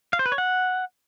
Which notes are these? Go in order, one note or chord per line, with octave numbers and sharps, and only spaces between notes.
F5
C5
B4
C#5
F#5